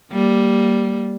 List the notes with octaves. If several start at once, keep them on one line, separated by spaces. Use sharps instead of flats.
G3 A#3